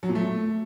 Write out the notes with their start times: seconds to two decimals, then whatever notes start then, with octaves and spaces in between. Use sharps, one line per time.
0.03 F#3
0.09 A#2
0.15 A3